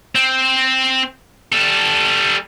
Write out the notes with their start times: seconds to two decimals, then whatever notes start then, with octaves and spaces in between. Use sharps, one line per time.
0.15 C4
1.52 G3 A4